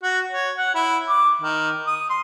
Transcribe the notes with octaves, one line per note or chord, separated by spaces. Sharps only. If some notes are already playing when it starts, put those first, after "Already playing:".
F#4
C#5
F#5
E4
D6
D#3
D#6
C6